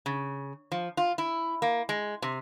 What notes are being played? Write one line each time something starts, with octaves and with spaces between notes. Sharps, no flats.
C#3
F3
F4
E4
A#3
G#3
C3